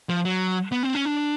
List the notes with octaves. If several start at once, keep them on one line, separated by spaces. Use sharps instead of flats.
F3
F#3
B3
C4
C#4
D4